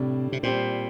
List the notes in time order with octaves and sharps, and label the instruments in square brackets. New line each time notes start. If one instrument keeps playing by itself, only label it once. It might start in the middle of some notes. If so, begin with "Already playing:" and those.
Already playing: [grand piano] A2 G3 D4 [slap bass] C3
[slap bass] C3
[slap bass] A#2 [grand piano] G3 C4 G4 C5